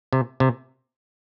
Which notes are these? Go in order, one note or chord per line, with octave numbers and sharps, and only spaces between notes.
C3
C3